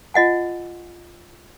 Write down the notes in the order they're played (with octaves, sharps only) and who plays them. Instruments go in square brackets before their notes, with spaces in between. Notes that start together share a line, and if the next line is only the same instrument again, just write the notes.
[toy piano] F4 D#5 F#5 G#5